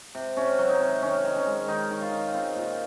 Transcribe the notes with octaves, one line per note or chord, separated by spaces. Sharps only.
C3
C3 C#4
F#3
D#4
C3
D#3 C#4
D#3
C#4
G#3
D#3 D#4
D#3
F4
D#3
C4 F4
A#2